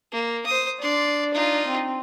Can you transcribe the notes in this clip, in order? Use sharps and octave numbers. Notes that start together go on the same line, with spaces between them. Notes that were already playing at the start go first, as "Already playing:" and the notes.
A#3
C5 D#6
D4 D5 C6
D#4 F4
C4